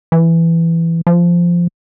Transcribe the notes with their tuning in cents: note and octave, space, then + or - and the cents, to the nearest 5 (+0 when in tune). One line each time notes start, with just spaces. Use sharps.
E3 +10
F3 -10